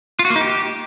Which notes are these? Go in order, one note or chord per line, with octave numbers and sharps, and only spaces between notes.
F4
F#4
A#3
D#4
G4